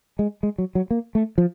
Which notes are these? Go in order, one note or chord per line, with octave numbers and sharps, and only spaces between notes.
G#3
G#3
F#3
F#3
A#3
A3
F3